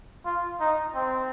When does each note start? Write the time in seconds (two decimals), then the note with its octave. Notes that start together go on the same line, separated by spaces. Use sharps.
0.25 F4
0.61 D#4
0.95 C4